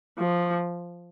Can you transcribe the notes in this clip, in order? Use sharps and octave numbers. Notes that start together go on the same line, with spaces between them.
F3